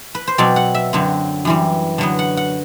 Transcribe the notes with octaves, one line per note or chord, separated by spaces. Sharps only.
B4
C5
B2 F#3 C4 D5
F#5
E5
F#2 D3 F#3 C4
F#2 E3 G3 C4
D3 F#3 B3
F#5
F#5